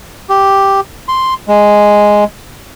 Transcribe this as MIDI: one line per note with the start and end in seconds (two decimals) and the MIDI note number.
0.29 0.80 67
1.08 1.34 84
1.48 2.24 56